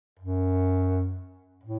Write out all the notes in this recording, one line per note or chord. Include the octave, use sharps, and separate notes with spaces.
F#2
A2